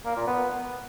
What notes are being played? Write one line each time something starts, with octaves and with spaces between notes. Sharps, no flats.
A#3
A#2
B3